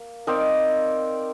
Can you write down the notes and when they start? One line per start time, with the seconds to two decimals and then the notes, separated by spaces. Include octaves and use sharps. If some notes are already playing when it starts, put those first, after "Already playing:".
Already playing: A#3
0.27 C4 D#4 A#4 D5